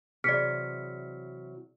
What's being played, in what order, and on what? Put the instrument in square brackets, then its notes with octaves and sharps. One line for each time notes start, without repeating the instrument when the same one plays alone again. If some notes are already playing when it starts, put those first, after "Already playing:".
[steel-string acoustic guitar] C3 E3 F#3 [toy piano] G#4 D5 [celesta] F6 B6 C#7